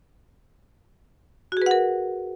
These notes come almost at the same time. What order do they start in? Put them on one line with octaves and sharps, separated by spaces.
F#4 G#4 B4 F#5 A#4